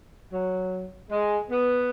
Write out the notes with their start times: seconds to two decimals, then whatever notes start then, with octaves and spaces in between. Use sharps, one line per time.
0.32 F#3
1.10 G#3
1.49 B3